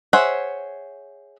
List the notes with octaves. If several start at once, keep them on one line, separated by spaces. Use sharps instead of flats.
G#4 C5 C#5 E5 F#5